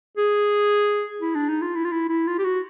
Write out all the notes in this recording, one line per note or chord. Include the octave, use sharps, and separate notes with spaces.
G#4
E4
D4
D#4
F4
E4
F4
E4
E4
F4
G4
F#4